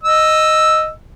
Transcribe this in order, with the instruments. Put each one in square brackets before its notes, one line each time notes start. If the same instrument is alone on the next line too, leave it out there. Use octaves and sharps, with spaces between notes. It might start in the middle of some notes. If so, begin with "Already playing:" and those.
[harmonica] D#5 E6